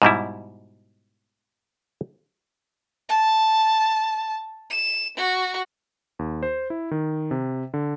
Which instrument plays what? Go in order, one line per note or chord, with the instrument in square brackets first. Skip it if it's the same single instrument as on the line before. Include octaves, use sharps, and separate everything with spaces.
[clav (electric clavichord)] G#2 B2 G3 E4
[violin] A5
E7
F#4
[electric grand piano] D#2
C5
E4
D#3
C3
D3